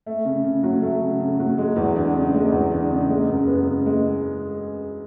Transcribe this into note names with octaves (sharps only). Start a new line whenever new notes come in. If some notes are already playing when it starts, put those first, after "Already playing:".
A3
C#3
C#3
F#3
A3
C#3
C#3
F#3
G#3
E2
D4
C#3
G#3
E2
D4
C#3
G#3
F#2
B3
C#3
G#3